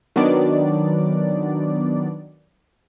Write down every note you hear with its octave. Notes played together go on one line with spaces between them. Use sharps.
D#3 F#3 B3 D4 D5